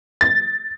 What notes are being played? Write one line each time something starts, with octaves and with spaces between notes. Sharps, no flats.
A6